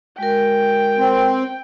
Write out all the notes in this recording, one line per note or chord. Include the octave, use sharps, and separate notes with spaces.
G#3 F#4 A#4 G5
C4